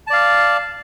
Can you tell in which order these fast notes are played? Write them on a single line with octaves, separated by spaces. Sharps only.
A5 D5 F5